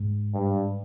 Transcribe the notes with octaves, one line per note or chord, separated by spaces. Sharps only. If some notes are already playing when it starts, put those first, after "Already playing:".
Already playing: G#2
G2